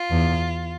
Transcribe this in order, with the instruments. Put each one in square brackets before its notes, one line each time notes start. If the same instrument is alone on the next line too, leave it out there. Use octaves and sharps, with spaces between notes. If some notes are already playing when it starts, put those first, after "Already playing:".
Already playing: [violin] F4
[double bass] E2